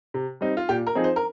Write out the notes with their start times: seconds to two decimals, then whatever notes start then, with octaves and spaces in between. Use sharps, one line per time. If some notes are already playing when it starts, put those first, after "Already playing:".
0.14 C3
0.41 G3 C4 D#4
0.57 F4
0.69 A#2 G4
0.87 A#4
0.95 F3 C4 D#4 G#4
1.04 C5
1.16 A#4